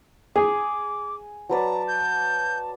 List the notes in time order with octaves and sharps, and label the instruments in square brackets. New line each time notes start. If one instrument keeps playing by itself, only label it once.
[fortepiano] G#4 [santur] G#5 [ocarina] D6
[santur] F#3 B4 D5 [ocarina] A5 [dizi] A#5
[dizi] G6